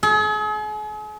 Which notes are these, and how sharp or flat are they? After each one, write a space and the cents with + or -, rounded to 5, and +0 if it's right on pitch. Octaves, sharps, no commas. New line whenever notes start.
G#4 +40